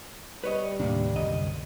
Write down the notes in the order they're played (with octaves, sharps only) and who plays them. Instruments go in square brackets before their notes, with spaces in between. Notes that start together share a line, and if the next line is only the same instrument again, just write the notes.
[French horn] G3 [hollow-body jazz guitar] B4 C#5 D#5
[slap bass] D#2 A2 C3 [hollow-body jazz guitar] A#3 D4
[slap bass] C2 F#2 D3 [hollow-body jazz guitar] D#5